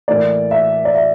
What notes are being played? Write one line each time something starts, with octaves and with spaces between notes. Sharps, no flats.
A2 E3 A#3 D5
E5
D5
E5